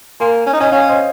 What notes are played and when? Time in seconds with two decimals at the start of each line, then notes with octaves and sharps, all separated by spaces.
0.20 A#3 G#5 C6
0.46 C#4
0.53 D#4
0.60 C#4 D#5
0.72 C#4 C#5 F5
0.88 C5 D#5